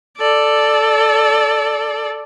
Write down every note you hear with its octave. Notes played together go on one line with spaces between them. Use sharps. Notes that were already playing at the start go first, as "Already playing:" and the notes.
A4 D5